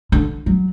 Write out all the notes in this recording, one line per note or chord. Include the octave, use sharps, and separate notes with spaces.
D3
F#3